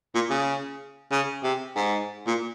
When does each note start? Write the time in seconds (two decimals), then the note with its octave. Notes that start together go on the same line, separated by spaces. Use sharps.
0.15 A#2
0.30 C#3
1.11 C#3
1.43 C3
1.76 G#2
2.27 A#2